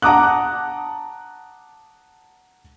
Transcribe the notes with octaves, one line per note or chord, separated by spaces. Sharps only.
F#5 A5 A#5 D6 D#6 F#6